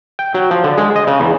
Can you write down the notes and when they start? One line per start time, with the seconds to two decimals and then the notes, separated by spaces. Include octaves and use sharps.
0.19 G5
0.34 F#3
0.51 F3
0.64 D3
0.77 G#3
0.96 D#5
1.07 C#3
1.20 E2